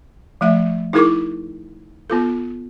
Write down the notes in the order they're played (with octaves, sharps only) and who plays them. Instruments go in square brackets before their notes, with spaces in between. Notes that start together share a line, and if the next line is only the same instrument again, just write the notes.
[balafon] F3 A3 E5
D#4 E4 G#4 A#4 C#6 D6
B3 F4 A4